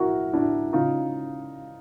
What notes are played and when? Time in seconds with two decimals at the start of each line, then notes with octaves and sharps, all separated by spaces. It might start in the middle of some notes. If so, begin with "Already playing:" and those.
Already playing: A#1 E4 F#4 A#4
0.33 D4 E4
0.73 C#3 D#4 F4